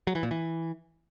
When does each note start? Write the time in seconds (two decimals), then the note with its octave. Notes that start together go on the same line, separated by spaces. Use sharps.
0.07 F#3
0.15 E3
0.23 A#2
0.31 E3